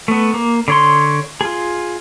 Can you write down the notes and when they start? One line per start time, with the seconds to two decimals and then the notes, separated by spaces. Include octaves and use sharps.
0.08 A3 B3
0.34 A#3
0.68 D3 C#5 C6
1.41 F4 G#4